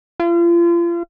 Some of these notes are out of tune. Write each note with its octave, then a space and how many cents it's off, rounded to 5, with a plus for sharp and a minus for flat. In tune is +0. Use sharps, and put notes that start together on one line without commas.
F4 -35